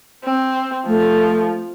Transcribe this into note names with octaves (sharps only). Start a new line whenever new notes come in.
C4
F3 A3